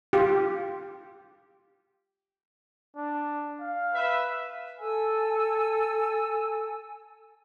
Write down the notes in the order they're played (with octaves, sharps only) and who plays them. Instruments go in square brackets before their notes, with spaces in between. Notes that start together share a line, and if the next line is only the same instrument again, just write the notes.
[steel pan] F4 G4
[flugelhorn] D4
F5
[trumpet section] B4 E5
[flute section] A4 G#5 E6